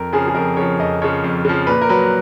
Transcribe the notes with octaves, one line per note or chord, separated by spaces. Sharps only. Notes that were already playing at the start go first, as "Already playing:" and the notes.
Already playing: F2 A#4
C#3 F3 G#4
G#4
F2 A#4
C#3 F3 C#5
F2 D#5
C#3 F3 C#5
F2
C#3 F3
A#2 B4
A#4
F#3 B4